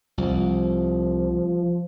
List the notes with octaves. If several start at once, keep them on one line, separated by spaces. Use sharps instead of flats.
C2 F3